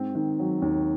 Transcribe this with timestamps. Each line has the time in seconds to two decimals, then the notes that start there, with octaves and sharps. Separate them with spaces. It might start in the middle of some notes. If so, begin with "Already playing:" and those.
Already playing: G#2 C4
0.15 D#3
0.39 F#3
0.62 D#2